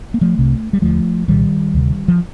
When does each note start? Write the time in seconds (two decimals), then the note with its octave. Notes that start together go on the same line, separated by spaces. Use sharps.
0.14 A#3
0.21 F3 A3
0.37 C2 C3
0.73 G3
0.82 D#2 D3 F3 A3
1.28 C2 A#2 D#3 G3
1.74 D2 C3
2.08 F3